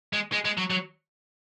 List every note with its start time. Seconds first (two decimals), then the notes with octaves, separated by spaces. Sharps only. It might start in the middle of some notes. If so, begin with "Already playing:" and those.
0.13 G#3
0.33 G#3
0.45 G#3
0.58 F#3
0.70 F#3